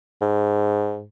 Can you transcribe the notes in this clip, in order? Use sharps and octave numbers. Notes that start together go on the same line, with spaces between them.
G#2